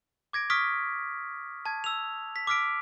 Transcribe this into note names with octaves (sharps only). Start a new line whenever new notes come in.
D6 G#6 A#6 D7
C#6 D#6 F6 B6 D7
A5 G#6
E6 F7
B6
D6 E6 F6 B6 D7